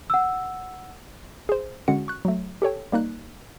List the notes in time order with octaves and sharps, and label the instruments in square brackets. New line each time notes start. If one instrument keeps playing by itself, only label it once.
[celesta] F#5 E6
[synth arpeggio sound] G#4 C5
D3 G#3 C#4 F#4 F#5 C#7
C#6 F#6
F#3 A3
G4 A4 C#5 G5
G3 A#3 D#4 F#6